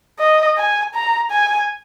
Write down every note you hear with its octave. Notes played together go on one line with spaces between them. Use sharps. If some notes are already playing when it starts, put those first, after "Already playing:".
D#5
G#5
A#5
G#5